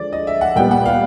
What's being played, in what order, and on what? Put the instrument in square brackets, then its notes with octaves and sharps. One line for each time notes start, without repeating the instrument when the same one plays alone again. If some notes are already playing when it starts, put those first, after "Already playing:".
Already playing: [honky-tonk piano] D3 F3 G#3 [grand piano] D5
[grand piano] D#5
E5
F#5
[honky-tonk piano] A#2 G3 B3 [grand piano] G5
[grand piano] F#5
F5